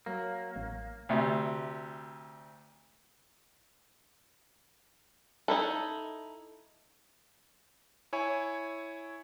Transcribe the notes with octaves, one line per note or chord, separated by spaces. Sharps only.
F#3 A#3
A1
D2 C3
D#4 E4 A4
E4 C#5 G#5 C#6